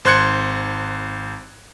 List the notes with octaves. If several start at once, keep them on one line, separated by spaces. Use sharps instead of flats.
G#1 C5 C6 F#6 G#6 C#7